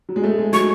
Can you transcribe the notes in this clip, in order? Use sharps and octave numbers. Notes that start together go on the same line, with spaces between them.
F#3
G#3
A3
G#3
F#3 C#6